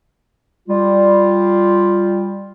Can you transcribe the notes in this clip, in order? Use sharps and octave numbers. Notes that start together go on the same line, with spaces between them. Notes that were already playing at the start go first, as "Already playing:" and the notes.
G3 F4